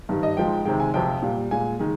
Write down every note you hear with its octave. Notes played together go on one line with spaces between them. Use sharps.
G2 D#3 G3
D#5
G#2 F3 G#3 G5
C3 D#3 G#3 G5
G#5
F2 C3 F3 G5
A#2 G3
A#2 G#3 G#5
D#3 G#3